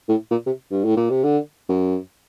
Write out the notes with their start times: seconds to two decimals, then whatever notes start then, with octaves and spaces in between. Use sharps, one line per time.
0.09 A2
0.31 A#2
0.46 C3
0.71 G2
0.85 A2
0.97 A#2
1.10 C3
1.24 D3
1.69 F#2